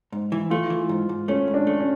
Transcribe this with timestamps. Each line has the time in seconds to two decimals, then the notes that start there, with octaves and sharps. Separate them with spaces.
0.12 G#2
0.32 E3
0.50 A3 F4
0.70 E3
0.89 G#2
1.09 G#2
1.28 A3 C#4
1.48 G#2
1.54 D4
1.67 A3
1.80 C#4